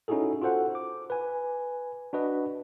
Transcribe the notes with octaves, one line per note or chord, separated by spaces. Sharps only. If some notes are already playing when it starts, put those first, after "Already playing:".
C#4 D#4 E4 F#4 G#4 A4
F4 F#4 A4 C5 F#5
D6
B4 G#5
D4 F#4 B4 D#5